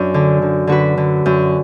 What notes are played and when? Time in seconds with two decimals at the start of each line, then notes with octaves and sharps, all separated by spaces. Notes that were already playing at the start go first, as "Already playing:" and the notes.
Already playing: F#2 D4
0.14 D3
0.42 D3
0.67 D3 F#4 B4
0.98 D3
1.26 F#2